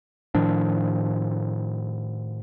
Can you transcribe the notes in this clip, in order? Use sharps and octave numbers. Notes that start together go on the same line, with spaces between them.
A2 D#3 F3 D4